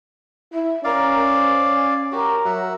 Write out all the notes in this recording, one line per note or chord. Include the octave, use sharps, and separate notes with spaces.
E4 E5
C#4 A#4 D5 F5
C5
G#5
F#4 G4 A#4
F#3 E5 F#5